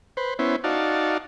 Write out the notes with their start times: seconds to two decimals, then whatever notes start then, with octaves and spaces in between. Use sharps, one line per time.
0.17 B4 C5
0.39 B3 C#4 E4 C5
0.64 D#4 F#4 D5 F5 A5